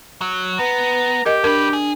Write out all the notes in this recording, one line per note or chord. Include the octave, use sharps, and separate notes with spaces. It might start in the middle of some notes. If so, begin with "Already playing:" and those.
F#3
B3 B4 A#5
G4 A#4 D#5
F2 D4 A#4 B4
G#4